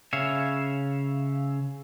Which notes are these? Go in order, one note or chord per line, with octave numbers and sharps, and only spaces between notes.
C#3 C#5 E5 F5